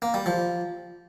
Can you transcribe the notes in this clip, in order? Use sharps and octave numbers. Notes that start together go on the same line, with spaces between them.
A#3
G3
F3